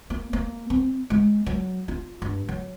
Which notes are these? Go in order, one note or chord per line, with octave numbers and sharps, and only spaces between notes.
A#3
A#3
C4
G#3
F#3
F4
G2
F#3